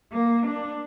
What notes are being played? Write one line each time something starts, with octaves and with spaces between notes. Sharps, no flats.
A#3
D4